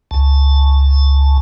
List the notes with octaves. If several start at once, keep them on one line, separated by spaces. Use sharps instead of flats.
C#2 A5